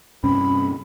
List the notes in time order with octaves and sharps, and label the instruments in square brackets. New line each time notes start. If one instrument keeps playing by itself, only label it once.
[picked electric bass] G2 C3 [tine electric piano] C#4 [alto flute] B5